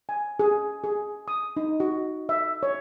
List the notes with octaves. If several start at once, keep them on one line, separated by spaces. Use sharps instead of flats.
G#5
G#4
G#4
D#6
D#4
F#4
E5
C#5